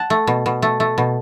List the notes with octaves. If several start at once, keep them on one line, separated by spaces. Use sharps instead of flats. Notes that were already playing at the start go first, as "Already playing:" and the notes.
Already playing: F#5 A5
A3
B2
B2
A3
A3
B2